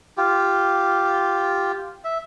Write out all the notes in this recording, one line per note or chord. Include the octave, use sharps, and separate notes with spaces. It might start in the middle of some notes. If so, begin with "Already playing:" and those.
F4 G4
E5